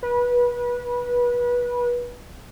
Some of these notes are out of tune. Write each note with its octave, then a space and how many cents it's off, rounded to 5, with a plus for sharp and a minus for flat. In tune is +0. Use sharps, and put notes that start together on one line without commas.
B4 -25